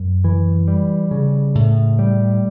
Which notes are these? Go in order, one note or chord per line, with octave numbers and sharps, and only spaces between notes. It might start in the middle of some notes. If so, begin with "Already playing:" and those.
Already playing: F#2
E3
G3
C#3
A2
G3